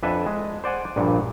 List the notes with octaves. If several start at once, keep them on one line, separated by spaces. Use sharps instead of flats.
F2 D4 A4 B4 E5 G#5
G#3
C5 D5 F#5 G#5
A#1 G2 A#2